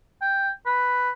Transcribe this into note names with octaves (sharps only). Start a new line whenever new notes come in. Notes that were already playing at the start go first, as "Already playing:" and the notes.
G5
B4